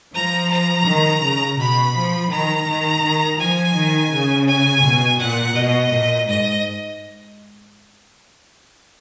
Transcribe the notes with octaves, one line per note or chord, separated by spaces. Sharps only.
F3 A#5
A#5
D#3
C#3
B2 B5
F3
D#3 A#5
D#3
D#3
F3 G#5
D#3
C#3
G#5
B2
A#2 F#5
B2 D#5
A#2
G#2 D#5